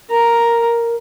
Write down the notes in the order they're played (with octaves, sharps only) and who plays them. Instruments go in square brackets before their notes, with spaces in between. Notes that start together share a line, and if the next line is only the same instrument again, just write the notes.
[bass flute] A#4 [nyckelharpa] A#5